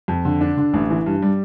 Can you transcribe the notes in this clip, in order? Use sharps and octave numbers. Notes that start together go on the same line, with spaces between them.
F2
D3
D4
D3
A1
E3
G2
G3